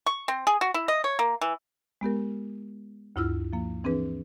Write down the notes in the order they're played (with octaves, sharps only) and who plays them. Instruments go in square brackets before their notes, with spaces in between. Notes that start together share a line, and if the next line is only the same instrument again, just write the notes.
[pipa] C#6
C4
G#4
F#4
E4
D#5
C#5
A#3
E3
[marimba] G#3 B3 G4 A#4
D2 G2 E4 F4 E6 F6
F3 A#3
E3 C4 D4 G#4 B4